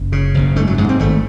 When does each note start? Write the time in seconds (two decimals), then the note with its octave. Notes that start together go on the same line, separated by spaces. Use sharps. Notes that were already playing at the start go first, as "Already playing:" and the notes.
Already playing: F#1
0.12 C#3
0.34 F#1
0.56 G#2 A3
0.67 F#3
0.78 G#2 G#3
0.89 C4
0.99 G#1 A3